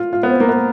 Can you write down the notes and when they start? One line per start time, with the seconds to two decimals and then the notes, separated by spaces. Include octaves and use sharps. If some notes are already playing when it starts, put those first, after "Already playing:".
Already playing: F4
0.13 F4
0.23 B3
0.30 C4
0.40 A#3
0.49 B3